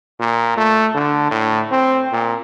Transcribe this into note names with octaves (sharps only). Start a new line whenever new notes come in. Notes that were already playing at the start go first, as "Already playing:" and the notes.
A#2
A3
D3
A2
C4
A#2